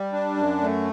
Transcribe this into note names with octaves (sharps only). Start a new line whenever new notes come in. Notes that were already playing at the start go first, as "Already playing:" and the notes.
Already playing: G3
D4
F#2
A3